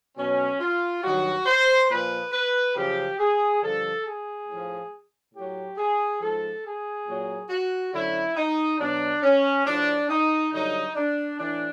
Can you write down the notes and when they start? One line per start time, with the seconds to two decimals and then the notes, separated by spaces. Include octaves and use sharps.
0.17 B2 F#3 C#4
0.60 F4
1.03 G2 D#3 F#3 F#4
1.46 C5
1.89 A#2 F3 B4
2.32 B4
2.75 F#2 C#3 F3 G4
3.19 G#4
3.62 G2 D3 F3 A4
4.05 G#4
4.48 A2 F3
5.34 A2 F#3 G4
5.77 G#4
6.20 G#2 F3 A4
6.64 G#4
7.07 A#2 F#3
7.50 F#4
7.93 F#2 D3 F#3 E4
8.36 D#4
8.79 B2 F#3 D4
9.23 C#4
9.66 A2 F3 D4
10.09 D#4
10.52 G2 D3 F#3 D#4
10.95 D4
11.38 A2 E3 D4